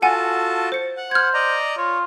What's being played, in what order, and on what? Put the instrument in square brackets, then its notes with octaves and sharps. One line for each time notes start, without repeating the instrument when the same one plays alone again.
[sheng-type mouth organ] F4 F#4 A5 [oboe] A4 [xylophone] F#5 G#5
[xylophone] C5 C#7
[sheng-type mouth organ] F#5
[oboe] C5 [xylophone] F6 G#6
[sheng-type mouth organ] D5 D#5 A#5
[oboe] F4 [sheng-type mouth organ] C#5